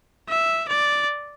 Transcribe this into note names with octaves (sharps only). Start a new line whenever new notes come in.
E5
D5